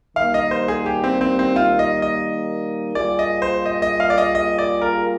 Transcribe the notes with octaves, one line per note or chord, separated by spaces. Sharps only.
D#3 G3 A#3 F5
D#5
C5
G#4
G4
C4
C4
C4
F4
D#5
D#5
G3 A#3 F4 G#4 D5
D#5
C5
D#5
D#5
F5
D5
D#5
D#5
D5
A#4